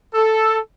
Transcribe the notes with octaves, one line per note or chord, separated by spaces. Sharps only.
A4